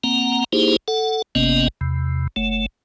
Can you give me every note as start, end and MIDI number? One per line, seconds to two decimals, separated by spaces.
0.04 0.44 58
0.04 0.44 60
0.04 0.44 78
0.04 0.44 82
0.53 0.76 58
0.53 0.76 63
0.53 0.76 64
0.53 0.76 67
0.53 0.76 68
0.53 0.76 72
0.88 1.22 69
0.88 1.22 78
1.35 1.68 31
1.35 1.68 48
1.35 1.68 58
1.35 1.68 59
1.35 1.68 61
1.35 1.68 75
1.81 2.27 40
1.81 2.27 48
2.36 2.66 30
2.36 2.66 57